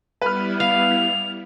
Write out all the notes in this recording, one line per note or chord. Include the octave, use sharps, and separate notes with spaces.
G3 B3 E4 B4 F6
F5 F7